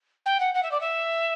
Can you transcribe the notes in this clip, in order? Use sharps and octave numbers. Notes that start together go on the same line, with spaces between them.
G5
F#5
F#5
E5
D5
E5